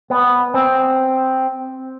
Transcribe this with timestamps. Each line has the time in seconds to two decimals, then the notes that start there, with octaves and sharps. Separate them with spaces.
0.10 B3
0.54 C4